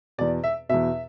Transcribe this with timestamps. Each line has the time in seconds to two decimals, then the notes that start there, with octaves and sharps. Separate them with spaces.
0.18 E2 B2 D5
0.44 E5
0.69 E2 B2 E5